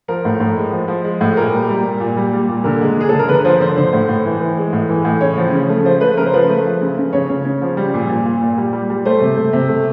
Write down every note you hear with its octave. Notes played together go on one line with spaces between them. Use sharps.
F3 A#4
A2
A2
G#3
F3
F3
G#3
A2
A#2 A#4
G3
G3
A#2
A#2
G3
G3
A#2
D3 A#4
G#3
D3 G#4
D3 A4
A#4
D3 B4
F3 C5
D3 C5
D3 C5
A2
A2
E3
E3
G#3
A2
E3
A2
C#3 C#5
F3
C#3
A3
F3 C5
A3 B4
C#3 A#4
C5
F3 B4
A3
F3
C#3
C#3
C#3 C#5
C#3
C#3
F3
G3
A#2
A#2
A#2
A#2
G3
G3
G3
A3 C5
C3
A3
C3
A3